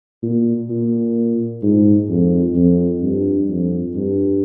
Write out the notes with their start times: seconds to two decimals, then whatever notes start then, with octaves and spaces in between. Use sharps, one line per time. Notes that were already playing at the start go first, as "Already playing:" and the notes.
0.23 A#2
0.70 A#2
1.63 G#2
2.09 F2
2.55 F2
3.02 G2
3.49 F2
3.95 G2